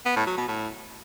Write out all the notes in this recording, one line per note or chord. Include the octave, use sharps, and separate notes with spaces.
B3
A2
F#3
B2
A2